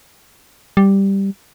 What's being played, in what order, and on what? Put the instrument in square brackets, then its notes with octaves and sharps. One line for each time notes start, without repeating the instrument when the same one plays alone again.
[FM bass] G3